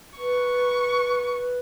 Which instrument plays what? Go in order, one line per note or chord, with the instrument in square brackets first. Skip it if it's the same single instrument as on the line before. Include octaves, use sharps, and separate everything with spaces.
[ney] B4 [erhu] C#6